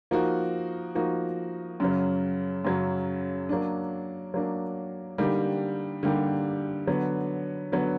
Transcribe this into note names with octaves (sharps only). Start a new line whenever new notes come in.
F3 A#3 D#4 F#4
F3 A#3 D#4 F#4
F#2 C#3 F#3
F#2 C#3 F#3
F#3 A#3 D4
F#3 A#3 D4
D3 G3 A#3 D#4 G4
D3 G3 A#3 D#4 G4
D3 F#3 B3
D3 F#3 B3